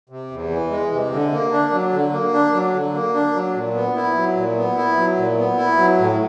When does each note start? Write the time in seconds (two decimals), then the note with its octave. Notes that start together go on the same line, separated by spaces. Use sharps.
0.09 C3
0.31 E2
0.50 E3
0.71 G#3
0.91 C3
1.11 D3
1.32 A#3
1.52 D4
1.72 F#3
1.92 D3
2.12 A#3
2.34 D4
2.53 F#3
2.74 D3
2.94 A#3
3.14 D4
3.34 F#3
3.55 A#2
3.74 B3
3.96 E4
4.15 F#3
4.36 A#2
4.56 B3
4.76 E4
4.97 F#3
5.17 A#2
5.37 B3
5.57 E4
5.77 F#3
5.98 A2